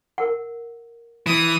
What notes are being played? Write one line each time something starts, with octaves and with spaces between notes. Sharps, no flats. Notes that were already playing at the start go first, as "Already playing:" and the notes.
A#4 F#5
E3 D#6